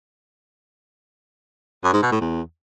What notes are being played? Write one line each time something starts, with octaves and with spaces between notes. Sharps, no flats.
F#2
G#2
B2
A2
E2